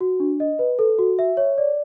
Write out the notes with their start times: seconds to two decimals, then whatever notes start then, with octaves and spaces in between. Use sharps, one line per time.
0.01 F#4
0.20 D4
0.40 D#5
0.59 B4
0.79 A4
0.99 F#4
1.19 E5
1.37 C#5
1.58 D5